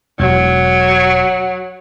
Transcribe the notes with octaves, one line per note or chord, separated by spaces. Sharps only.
E1 F#3